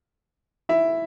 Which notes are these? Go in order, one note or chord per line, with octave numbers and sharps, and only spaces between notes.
E4 E5